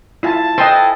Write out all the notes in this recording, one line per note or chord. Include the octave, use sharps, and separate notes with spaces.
E4 F4 A5
E4 A4 B4 C5 D#5 G5 G#5 C6